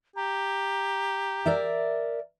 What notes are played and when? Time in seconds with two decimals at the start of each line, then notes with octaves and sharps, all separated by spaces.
0.16 G4 A#5
1.46 A#4 D5 E5